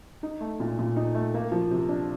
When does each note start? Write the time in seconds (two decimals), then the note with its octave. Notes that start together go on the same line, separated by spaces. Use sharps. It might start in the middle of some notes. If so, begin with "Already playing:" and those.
0.23 D#4
0.41 A3
0.60 A#2
0.79 A#2
0.96 D#4
1.15 A3
1.34 A#3
1.52 F3
1.71 C3
1.89 D4